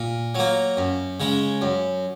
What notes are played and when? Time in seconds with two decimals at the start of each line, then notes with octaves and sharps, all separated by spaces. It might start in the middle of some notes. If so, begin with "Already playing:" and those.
Already playing: A#2
0.35 F#3 A#3
0.77 F#2
1.20 C#3 G#3
1.62 F#2